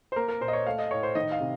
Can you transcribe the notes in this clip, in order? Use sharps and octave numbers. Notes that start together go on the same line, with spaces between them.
C5
A#3 A#4
A#4
A#2 C5
D#5
C#5
A3 F5
D#5
A2 C#5
C5
D#3 D#5
F5
C3